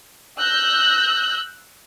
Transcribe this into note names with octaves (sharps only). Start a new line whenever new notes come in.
E6 F#6 G6 A#6